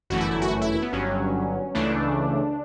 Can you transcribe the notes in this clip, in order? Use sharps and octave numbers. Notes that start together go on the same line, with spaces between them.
G1 F#2 E3 A3 F#4
E4
E4
F#4
E4
E4
B3
G1 G2 F#3 C#4
C#2 C#3 E3 A3 D4